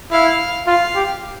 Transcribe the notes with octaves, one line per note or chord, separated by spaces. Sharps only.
E4 F5
F4 F5
G4